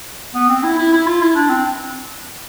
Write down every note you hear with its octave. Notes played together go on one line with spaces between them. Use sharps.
B3
C4
E4
E4
E4
F4
E4
D4
C4